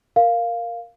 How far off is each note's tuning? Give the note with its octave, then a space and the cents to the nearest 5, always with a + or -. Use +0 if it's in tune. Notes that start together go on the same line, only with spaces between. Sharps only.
A#4 +0 F5 +0